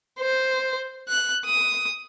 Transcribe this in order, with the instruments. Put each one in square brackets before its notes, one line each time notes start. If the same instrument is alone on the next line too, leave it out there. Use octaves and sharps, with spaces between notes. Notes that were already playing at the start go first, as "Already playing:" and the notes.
[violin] C5
F#6
D#6